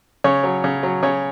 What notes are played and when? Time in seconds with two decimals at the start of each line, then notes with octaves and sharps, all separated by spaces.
0.24 C#3 C#5
0.43 F#3
0.64 C#3
0.83 F#3
1.03 C#3 C#5